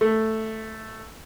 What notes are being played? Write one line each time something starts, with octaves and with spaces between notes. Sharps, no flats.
A3